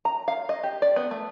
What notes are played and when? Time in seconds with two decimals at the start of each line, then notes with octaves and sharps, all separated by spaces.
0.05 A#5
0.28 F5
0.49 D#5
0.63 G4
0.82 D5
0.96 B3
1.11 A3